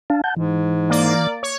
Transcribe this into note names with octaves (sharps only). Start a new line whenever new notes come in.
D4 F5 A5
F#5 A5 G6
G#2 E3
A#3 D5
C#5